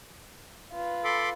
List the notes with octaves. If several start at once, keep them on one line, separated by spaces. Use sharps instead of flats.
F4 B4
A4 B5 C6 D6